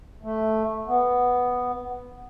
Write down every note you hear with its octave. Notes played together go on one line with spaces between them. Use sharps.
A3
B3